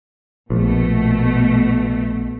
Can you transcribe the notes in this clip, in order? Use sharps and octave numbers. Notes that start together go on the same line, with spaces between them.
A#1 B2 A3